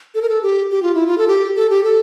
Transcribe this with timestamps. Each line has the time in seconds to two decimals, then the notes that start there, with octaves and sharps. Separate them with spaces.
0.15 A4
0.22 A#4
0.29 A4
0.43 G4
0.71 G4
0.82 F4
0.95 E4
1.07 F4
1.18 A4
1.28 G4
1.56 A4
1.70 G4
1.84 A4